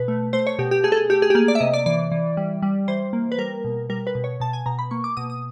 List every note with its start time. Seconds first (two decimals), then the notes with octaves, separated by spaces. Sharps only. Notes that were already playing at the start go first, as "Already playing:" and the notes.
Already playing: B2 B4
0.08 A3
0.33 A3 C5
0.47 C#5
0.59 B2 G4
0.71 G4
0.84 A3 G#4
0.92 A4
0.97 G#4
1.10 A3 G4
1.22 G#4
1.30 G4
1.35 A#3 G#4
1.48 D5
1.55 E5
1.60 C3 D#5
1.74 D5
1.86 E3 D5
2.12 E3
2.37 G3
2.62 G3
2.88 E3 C5
3.13 A#3
3.32 B4
3.38 G3 A#4
3.64 B2
3.90 G3 A#4
4.07 B4
4.15 B2
4.24 C#5
4.40 B2 A5
4.53 G#5
4.66 B2 A#5
4.79 B5
4.91 A#3 C#6
5.04 D6
5.17 B2 D#6
5.30 D#6